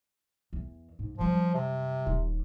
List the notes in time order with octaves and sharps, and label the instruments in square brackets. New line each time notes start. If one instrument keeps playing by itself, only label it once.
[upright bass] E2
G#2
[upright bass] F#2 G3 [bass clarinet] F3
[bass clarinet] C3
[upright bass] D#1 D#2